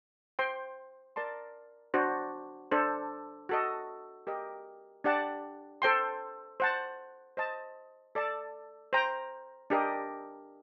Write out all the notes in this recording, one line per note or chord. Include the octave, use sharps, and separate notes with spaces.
C5 G5 C6
A#4 D5 A5 C6
D4 F#4 C5
D4 A4 C5
F#4 A4 D#5
G4 A#4 D#5
D4 G4 D5 F#5 A5
A4 C5 G5 C6
C5 F#5 A5
C5 D#5 A5
A4 D5 A5
C5 G5 A#5
D4 G4 A#4 D#5